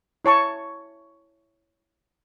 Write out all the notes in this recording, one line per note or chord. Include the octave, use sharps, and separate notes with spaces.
E4 C#5 A5 C#6